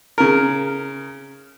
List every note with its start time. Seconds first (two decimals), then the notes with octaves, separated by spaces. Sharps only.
0.18 C#3 A#4